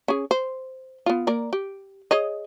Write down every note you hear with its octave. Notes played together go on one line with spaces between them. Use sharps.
C#4 G#4
C5
B3 F4
A#3 A#4 D5
G4
G#4 C#5 D#5